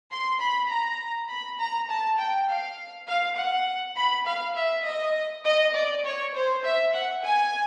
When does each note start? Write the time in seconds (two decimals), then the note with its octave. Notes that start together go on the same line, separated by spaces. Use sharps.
0.11 C6
0.39 B5
0.69 A#5
1.29 B5
1.58 A#5
1.88 A5
2.18 G5
2.47 F5
3.08 F5
3.37 F#5
3.96 B5
4.26 F5
4.56 E5
4.85 D#5
5.44 D#5
5.74 D5
6.04 C#5
6.34 C5
6.63 E5
6.92 F#5
7.22 G#5